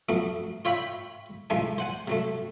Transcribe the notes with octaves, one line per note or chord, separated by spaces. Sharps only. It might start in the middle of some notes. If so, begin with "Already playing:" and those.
F2 F#3 A3 B3
F4 C#5 E5 G5 B5
A2 C3 E3 F3 G#3 A3
C5 F#5 G#5
C3 F#3 A3